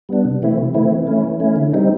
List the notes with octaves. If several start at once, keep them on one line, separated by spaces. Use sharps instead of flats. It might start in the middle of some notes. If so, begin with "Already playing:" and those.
G3 B3 D4
C3
E3 A3 C4 E4
C3
E3 A3 C4 E4
E3
A3 C#4 E4
E3
A3 C#4 E4
D3
G3 C4 D#4